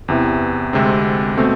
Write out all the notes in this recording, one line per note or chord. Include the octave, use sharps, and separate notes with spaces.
E2 C3 E3
D2 C3 G#3 C4
B2 A3 C4